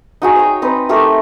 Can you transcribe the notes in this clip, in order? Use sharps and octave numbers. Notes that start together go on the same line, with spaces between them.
D#4 F#4 G#4
C#5 G5
C4 D#4 B4
A3 D#4 G4 A#4